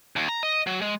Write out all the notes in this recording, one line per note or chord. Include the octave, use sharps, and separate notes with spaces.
D#2
A#5
D#5
F#3
G#3